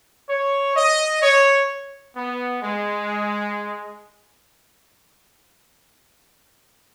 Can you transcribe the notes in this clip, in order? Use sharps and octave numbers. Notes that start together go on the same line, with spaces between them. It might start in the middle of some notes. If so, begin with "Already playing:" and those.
C#5
D#5
C#5
B3
G#3